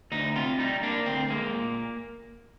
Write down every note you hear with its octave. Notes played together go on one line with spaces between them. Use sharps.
D2 D#4
C3 F4
G3 D#4
A#3 D4
D2 C4
G#3 A#3
A#2